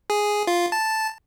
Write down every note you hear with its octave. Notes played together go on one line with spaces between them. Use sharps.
G#4
F4
A5